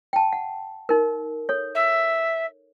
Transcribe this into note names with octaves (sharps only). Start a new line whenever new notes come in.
G5 A5
F#5
D#4 A#4
A4 C#5
E5